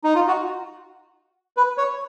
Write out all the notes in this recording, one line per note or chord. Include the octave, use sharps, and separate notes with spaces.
D#4
F4
F#4
B4
C#5